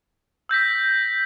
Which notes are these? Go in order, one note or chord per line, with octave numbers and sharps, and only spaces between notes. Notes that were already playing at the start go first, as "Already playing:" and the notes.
E6 G6 A#6 B6